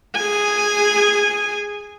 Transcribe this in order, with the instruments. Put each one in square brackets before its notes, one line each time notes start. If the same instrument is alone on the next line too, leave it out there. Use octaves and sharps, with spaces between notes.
[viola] G#4 G#5